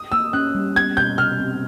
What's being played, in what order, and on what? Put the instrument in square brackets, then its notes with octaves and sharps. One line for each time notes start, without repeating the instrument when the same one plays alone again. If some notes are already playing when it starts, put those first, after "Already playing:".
Already playing: [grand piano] D#6
[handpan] A#3 [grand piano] E6
[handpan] C#4 [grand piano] F#6
[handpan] G3
[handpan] B3 [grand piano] G#6
[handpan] B2 [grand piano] G6
[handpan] C3 [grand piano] F6
[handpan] C4